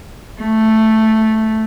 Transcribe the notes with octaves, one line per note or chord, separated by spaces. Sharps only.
A3